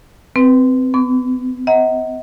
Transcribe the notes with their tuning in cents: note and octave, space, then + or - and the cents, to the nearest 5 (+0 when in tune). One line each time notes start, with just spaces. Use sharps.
C4 -20 B4 +0
B3 +40 D6 -40
D#5 +40 F#5 +10 A#5 +0